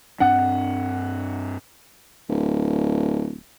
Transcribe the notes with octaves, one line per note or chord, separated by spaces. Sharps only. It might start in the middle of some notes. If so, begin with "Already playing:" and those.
G2 C4 D4 F#5
D1